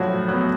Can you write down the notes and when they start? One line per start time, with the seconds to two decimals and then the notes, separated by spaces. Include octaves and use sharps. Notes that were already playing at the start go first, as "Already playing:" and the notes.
Already playing: A2 F3 F#3 F#4
0.28 F#3 B3